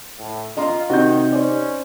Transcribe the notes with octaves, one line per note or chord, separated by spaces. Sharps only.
A2
F4 D#5 A#5 C6
C3 D#3 D#4 F#4 D#5 G6
C#4 C5 D5